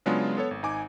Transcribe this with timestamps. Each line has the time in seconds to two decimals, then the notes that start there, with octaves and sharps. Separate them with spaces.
0.06 C#3 F#3 G#3 B3 D4 F4
0.37 B3 A4 C#5
0.51 G#1
0.63 G#1 D#4 G#5 D6